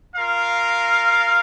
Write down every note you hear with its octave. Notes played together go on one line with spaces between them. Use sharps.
F4 A#4 F5